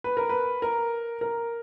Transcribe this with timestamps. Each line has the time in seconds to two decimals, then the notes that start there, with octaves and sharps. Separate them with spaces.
0.04 B4
0.17 A#4
0.29 B4
0.62 A#4
1.21 A#4